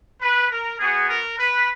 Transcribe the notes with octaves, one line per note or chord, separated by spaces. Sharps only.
B4
A#4
B3 F#4 G#4
A#4
B4